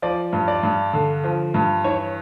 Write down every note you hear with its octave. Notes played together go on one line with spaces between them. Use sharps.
F3 D5
G2
D5
G2
D3
F3
G2
E3 C#5